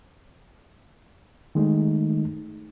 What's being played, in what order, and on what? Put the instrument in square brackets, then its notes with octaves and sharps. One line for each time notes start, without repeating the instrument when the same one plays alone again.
[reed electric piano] D#3 G#3 A3 D#4